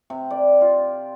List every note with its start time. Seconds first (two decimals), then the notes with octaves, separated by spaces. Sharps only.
0.10 C3
0.30 D5
0.61 F4